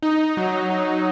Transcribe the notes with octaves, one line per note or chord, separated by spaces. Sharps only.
D#4
F#3
D#4